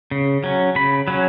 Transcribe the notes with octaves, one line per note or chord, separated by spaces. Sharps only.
C#3
F#3 C#4
C#3 B5
F#3 C#4